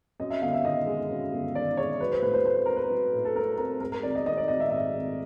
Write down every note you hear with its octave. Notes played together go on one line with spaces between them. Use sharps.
F#2 D#5
E5
G1 F5
E5
D#3 D#5
G#3
F#2
G1
D#3 D5
G#3 C#5
F#3 B4
C5
A2 B4
C5
A3 C5
B4
C4 A#4
B4
F#3
A2
A4
A3 A#4
C4 A#4
G#2 A#4
A#4
G#1 D5
D#5
D#3 D#5
D5
G#1 D#5
E5
G#2 E5
G#1